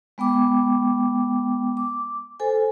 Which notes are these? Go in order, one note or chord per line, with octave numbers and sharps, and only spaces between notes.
G#3 B3 G5 D6
D6
A4 C5 G#5